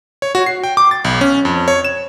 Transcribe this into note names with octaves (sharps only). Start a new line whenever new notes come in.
C#5
F#4
C7
G5
D6
A6
B1
C#4
F2
C#5
E7